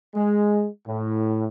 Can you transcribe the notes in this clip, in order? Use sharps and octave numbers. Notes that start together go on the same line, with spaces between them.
G#3
A2